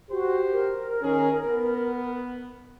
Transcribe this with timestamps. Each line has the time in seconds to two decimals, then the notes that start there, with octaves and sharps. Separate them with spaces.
0.10 F#4 G4 C5
0.51 A#4
1.02 D#3 C#4 G#4
1.46 B3